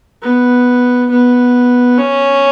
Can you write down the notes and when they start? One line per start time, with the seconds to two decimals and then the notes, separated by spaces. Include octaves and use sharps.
0.22 B3
1.10 B3
1.98 C#4